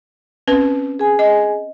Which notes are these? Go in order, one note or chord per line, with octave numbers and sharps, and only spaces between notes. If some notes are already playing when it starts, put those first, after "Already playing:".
C4 C#4 B4
G#4 G#5
D#5